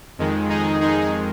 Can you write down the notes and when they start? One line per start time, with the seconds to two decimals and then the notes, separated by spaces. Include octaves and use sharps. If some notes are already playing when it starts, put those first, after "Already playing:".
0.18 F2 D#3 G#3
0.49 D#4 G#4
0.81 D#4 G#4